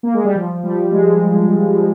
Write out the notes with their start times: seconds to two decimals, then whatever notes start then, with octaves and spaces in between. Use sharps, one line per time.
0.03 A#3
0.14 G#3
0.25 G3
0.35 F3
0.64 G3
0.92 G#3